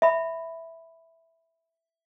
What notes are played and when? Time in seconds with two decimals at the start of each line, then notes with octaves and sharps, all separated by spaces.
0.02 E5 B5